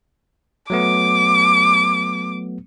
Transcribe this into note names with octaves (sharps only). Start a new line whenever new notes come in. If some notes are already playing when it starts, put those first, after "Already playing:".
F#3 A3 B3 D6